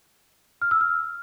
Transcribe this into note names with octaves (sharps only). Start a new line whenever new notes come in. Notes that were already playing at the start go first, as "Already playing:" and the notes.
F6
E6
F6